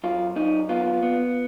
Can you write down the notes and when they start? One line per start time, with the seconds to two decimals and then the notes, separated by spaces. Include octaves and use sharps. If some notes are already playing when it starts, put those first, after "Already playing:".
0.04 F#2 F4
0.36 F#2 D#4
0.69 B3 F4
1.02 B3